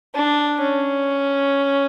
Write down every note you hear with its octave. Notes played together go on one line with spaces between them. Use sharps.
D4
C#4